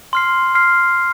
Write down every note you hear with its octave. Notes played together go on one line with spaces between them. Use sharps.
C6 F6 C7
C6 F6 C7